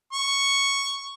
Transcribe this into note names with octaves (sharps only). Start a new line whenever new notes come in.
C#6